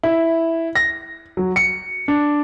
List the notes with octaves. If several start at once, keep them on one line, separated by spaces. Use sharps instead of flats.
E4
A#6
F#3
C#7
D4